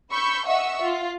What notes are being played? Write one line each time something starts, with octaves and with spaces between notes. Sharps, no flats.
B5 C#6 E6 G6
D#5 E5 F#5 C#6 E6
F4